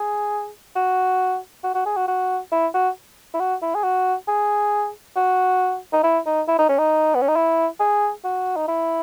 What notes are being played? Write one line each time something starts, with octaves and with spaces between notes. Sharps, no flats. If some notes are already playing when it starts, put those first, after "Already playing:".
Already playing: G#4
F#4
F#4
F#4
G#4
F#4
F#4
E4
F#4
E4
F#4
E4
G#4
F#4
G#4
F#4
D#4
E4
D#4
E4
D#4
C#4
D#4
B3
C#4
D#4
E4
G#4
F#4
D#4
E4